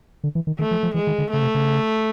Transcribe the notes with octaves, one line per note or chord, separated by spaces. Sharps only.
D3
E3
D#3
D#3 A3
F3
F3
E3 G#3
D#3
D3
C#3 A3
C3
C#3